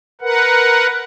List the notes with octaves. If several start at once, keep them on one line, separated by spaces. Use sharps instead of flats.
A#4 B4 F#5